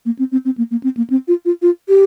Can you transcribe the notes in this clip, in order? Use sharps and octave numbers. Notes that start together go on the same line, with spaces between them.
A#3
C4
C4
C4
A#3
A#3
C4
A#3
C4
F4
F4
F4
G4